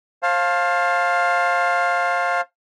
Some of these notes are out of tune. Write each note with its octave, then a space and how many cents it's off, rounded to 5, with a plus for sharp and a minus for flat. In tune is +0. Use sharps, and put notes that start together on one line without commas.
C5 +35 F5 +5 A5 +0